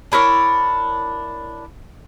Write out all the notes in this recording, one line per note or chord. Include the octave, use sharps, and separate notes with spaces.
D4 E4 A#4 C#5